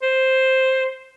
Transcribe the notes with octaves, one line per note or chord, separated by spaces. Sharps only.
C5